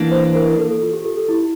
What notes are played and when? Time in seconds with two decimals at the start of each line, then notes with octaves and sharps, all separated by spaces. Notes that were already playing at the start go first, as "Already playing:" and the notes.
Already playing: E3 A#3 D4
0.12 C5
0.35 A#4
0.49 A#4
0.59 A4
0.82 F4
0.93 G4
1.05 A4
1.17 G4
1.29 E4